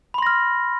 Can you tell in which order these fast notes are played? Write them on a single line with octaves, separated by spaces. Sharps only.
B5 C6 A#6 F6